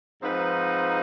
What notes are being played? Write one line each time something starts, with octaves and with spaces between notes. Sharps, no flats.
G#2 F3 C4 D#4 B4